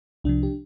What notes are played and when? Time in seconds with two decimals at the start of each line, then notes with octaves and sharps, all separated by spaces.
0.24 C2 C3 F3 D4
0.43 G4